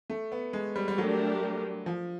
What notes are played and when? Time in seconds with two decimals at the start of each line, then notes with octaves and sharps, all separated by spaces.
0.10 A3
0.32 B3
0.53 G#3
0.76 G3
0.88 G3
0.98 F#3 A3 D4 G4 A#4
1.86 F3